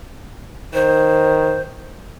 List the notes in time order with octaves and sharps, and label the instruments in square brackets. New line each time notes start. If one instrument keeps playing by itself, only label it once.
[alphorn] D#3 [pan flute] C5